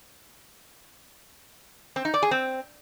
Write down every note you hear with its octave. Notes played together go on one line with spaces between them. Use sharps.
C4
D#4
D5
G#4
C4